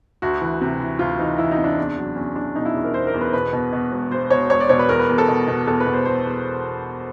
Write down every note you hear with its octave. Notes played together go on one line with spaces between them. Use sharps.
D2 F#4
E3
C3
E3
D2 F4
E3 D#4
E3 E4
D#4
C3
D4
E2
F#3
E2 C#4
E2 D4
B2 D#4
E4
E2
A#4
E2 C5
A#4
E2
B4
B2 B4
B2
B2
E1
E1 C5
B2 C#5
E1 C#5
D5
B2 C#5
B4
E2 A#4
B4
E2
A4
B2
B2
E2 A4
B4
B2
C5
E2 C5
E2